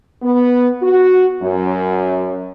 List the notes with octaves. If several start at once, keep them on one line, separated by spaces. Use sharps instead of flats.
B3
F#4
F#2